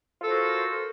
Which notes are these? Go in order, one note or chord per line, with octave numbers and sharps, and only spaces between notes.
F4 F#4 A4 A#4 C5